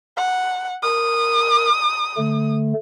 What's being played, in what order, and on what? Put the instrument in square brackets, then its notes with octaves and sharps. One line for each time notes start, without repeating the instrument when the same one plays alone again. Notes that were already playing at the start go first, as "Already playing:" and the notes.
[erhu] F#5
[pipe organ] A#4 [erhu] D#6
[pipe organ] D3 A3